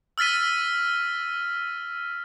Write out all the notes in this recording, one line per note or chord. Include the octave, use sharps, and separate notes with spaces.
E6 F6 A6 B6 D#7